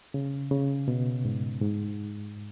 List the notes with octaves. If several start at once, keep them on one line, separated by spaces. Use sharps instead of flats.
C#3
C#3
B2
G#2
G#2